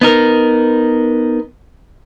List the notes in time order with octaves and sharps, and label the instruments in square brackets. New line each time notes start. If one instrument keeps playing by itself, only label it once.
[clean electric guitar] B3 D#4 A#4